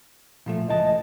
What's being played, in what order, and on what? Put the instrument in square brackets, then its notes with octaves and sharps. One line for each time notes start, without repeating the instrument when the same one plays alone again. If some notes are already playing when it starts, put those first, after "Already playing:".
[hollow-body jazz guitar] A#2 F3 A3
[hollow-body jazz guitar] C#2 E3 A5 [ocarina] D#5